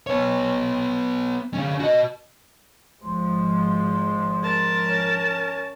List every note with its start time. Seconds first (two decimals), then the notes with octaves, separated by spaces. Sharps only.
0.07 B3 C#5
1.54 D3 C#4
1.80 F#4 D#5
3.03 G#1 F3 G#3 C5
4.43 A#4 A5
4.85 C#4